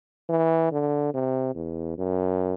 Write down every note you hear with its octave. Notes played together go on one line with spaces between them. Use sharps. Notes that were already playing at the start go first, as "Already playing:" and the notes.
E3
D3
C3
E2
F#2